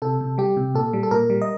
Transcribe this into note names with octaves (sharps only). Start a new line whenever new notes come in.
C3 A4
C3
G3 G4
C3
A#2 A4
G3
A4
A#2 A#4
G3
D#5